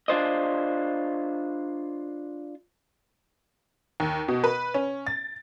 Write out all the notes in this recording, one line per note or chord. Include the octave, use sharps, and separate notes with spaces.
D4 F4 C5 D#5
D#2
B2
B4
C#4
A6